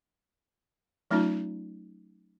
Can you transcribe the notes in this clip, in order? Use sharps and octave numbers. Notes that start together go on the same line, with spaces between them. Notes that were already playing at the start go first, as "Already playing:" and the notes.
F#3 A3 C#4 D#4 F4